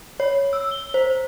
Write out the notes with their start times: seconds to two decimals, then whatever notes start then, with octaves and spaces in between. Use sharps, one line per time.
0.20 C#5
0.53 E6
0.71 G7
0.94 C5